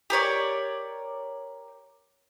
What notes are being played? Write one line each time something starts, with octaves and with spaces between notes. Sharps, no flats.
G4 A#4 C#5 D5